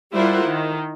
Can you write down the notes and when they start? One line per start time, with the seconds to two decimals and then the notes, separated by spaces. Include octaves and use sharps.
0.13 G3 E4 F4 A#4 C5 F#5
0.45 D#3